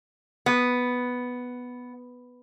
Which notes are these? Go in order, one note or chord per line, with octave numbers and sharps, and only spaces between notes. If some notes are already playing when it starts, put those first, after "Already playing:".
B3